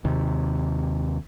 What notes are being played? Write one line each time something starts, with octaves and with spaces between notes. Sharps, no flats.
D#2 C3